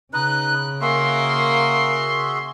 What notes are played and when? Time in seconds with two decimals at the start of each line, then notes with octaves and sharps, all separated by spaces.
0.13 C#3 D#4 B4 D#5 F#6
0.81 A#3 F#4 G#4 E5 C6